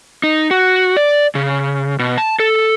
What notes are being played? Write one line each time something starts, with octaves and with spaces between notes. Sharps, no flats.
D#4
F#4
D5
C#3
B2
A5
A4